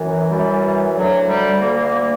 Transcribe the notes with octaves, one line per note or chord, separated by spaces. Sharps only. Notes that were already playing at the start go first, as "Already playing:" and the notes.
Already playing: F#2 E3
F#2 E3 G3
D2 D3 F#3
G3
D2 D3 A#3
A#3
A#3